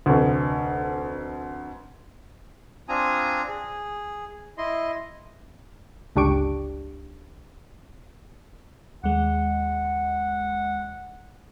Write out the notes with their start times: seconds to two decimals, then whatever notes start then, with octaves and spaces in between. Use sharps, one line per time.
0.06 F1 D2
2.89 C4 D4 F4 G#5 A#5 D#6
3.49 G#4
4.58 E4 D#5 C6
6.16 G1 C#2 D4 G4 C#6 D7
9.04 D#2 G#3 F#5